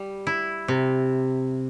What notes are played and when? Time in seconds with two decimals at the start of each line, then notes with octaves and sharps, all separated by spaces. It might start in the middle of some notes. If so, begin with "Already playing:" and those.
Already playing: G3
0.27 E4
0.68 C3